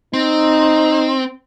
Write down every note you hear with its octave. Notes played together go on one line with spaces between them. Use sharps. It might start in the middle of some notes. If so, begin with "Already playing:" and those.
C4 D#4